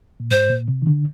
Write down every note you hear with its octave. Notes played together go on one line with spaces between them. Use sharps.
A#2
G#2 C5
A#2
C3
D#3
D3